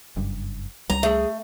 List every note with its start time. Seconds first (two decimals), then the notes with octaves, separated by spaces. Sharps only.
0.16 F#1 G2
0.90 C#2 G3 A#5
1.03 A3 G#4